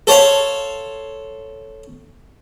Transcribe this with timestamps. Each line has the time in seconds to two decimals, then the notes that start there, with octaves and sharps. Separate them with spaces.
0.07 A4 C5 C#5 F5